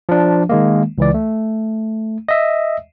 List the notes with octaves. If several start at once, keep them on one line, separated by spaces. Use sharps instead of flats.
F3 D4
D#3 G#3 A#3
C#2 E3 D5
A3
D#5 E5